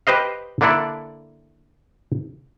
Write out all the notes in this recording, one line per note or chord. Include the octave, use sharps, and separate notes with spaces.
G4 B4 C5 D#5 F5
D3 A#3 D4 E4 A4 D5